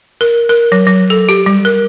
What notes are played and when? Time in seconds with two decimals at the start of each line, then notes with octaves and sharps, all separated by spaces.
0.21 A#4
0.49 A#4
0.72 F#3
0.87 F#3
1.10 A4
1.29 G4
1.46 G3
1.65 A#4